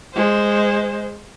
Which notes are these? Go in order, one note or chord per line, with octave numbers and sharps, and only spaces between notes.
G#3 C5